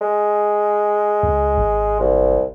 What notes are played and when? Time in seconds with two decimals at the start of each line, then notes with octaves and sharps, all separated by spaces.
0.01 G#3
1.23 C#2
1.58 G#1
1.99 C2